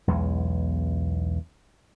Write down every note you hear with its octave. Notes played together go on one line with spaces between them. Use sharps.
B1 E2 G#3